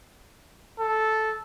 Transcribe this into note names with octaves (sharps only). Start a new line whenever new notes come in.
A4